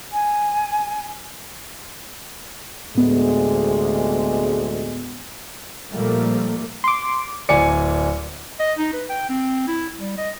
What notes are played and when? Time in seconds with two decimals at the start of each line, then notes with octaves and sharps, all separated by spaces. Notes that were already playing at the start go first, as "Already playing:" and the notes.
0.12 G#5
2.95 D2 A2 C3 G#3 B3
5.89 A#2 F3 G3 A3 A#3
6.84 C6 D6
7.49 D1 D5 G#5 C#7
8.60 D#5
8.78 D#4
8.94 B4
9.09 G5
9.29 C4
9.67 E4
10.00 G3
10.17 D#5